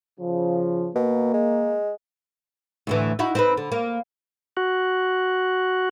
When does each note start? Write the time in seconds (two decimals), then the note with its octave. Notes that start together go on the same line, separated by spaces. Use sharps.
0.20 C#3 F3
0.96 B2 A#3
1.34 G#3
2.87 D2 A2 E3
3.19 D#4 E4 F#4
3.35 C4 D#4 B4
3.57 D3
3.72 A#3
4.57 F#4